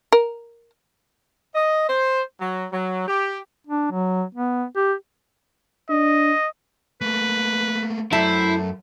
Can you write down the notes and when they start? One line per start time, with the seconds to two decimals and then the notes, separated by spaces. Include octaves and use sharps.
0.12 A#4
1.55 D#5
1.88 C5
2.40 F#3
2.71 F#3
3.08 G4
3.67 D4
3.92 F#3
4.35 B3
4.76 G4
5.90 D4 D#5
7.01 A3 A#3 B4
8.13 F#2 A3 E4 C5 E5 A5